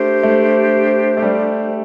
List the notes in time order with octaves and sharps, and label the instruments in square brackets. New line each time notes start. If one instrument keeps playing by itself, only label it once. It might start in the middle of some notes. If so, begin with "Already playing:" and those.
Already playing: [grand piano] A3 [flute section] D4 G4 C5
[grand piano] A3
A3
G3